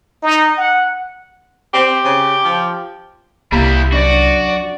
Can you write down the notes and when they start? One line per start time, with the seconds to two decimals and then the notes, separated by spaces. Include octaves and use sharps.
0.22 D#4
0.57 F#5
1.74 C4 G4
2.05 C#3
2.44 F3
3.52 C2 G3 A#3 E4 G4 A#5 B5
3.92 F#2 F3 D4 F#4 D5